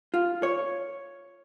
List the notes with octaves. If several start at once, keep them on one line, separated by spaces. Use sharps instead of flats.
F4
C#5